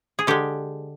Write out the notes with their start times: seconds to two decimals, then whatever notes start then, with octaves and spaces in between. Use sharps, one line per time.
0.19 G#4
0.27 D3 G#3 G4